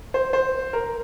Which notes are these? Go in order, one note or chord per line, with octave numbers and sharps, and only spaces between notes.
C5
C5
A#4